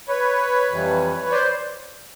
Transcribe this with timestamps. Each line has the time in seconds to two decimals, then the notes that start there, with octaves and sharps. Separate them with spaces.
0.08 B4 C#5
0.70 F2 C3 E3 G3
1.31 C5 D5